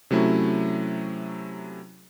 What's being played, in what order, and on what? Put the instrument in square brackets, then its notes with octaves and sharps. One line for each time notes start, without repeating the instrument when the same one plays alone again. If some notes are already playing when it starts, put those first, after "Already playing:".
[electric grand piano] C3 F#3 A3 C#4 E4